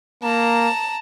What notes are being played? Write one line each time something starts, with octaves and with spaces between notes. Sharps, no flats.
A#3 A5 A#5